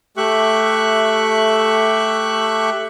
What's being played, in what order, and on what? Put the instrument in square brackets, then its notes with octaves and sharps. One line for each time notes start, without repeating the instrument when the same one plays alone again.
[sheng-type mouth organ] A3 G4 E5 C#6 F#6